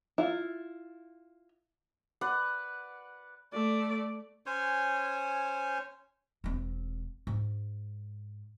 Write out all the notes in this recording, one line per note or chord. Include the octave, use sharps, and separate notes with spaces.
E4 F4
B4 D5 F#5
A3 D5
C#4 C5 C#5 G#5
E1 C4
G#2